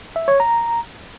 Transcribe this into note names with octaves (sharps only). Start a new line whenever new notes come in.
E5
C#5
A#5